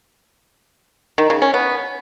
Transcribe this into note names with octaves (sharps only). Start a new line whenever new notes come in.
D#3
C#3
C#4
B3